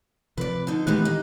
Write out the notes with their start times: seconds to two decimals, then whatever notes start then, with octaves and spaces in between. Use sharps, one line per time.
0.37 C3 F3 B4 D5
0.67 D3 D#4
0.87 D#3 E3 G#3 B3 D#4 G4 F#6
1.05 D#4